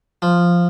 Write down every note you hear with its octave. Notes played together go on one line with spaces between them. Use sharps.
F3